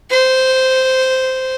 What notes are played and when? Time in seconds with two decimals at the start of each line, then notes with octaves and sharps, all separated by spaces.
0.10 C5